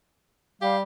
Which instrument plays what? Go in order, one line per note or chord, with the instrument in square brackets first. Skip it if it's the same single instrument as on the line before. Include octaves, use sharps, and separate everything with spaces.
[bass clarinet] G3 [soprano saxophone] G4 [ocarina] F5